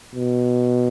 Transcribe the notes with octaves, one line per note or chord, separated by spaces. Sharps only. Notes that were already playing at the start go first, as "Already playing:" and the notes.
B2